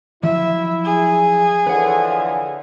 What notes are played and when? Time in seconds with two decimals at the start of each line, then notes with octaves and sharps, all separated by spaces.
0.23 F3 F#3 E4 E5
0.85 G#4
1.67 D3 E3 F3 B4 C#5 F#5